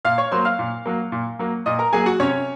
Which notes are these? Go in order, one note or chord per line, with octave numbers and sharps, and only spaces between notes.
A#2 F5 F6
C#5 C#6
F#3 A#3 C5 C6
F5 F6
A#2
F#3 A#3
A#2
F#3 A#3
A#2 D#5 D#6
A#4 A#5
F#3 A#3 G#4 G#5
F#4 F#5
C3 C#4 C#5